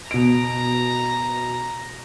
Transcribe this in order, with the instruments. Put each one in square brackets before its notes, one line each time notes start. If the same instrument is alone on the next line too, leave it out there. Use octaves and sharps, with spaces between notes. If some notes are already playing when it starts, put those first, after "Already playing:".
[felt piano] B2 D7 [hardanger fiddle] A#5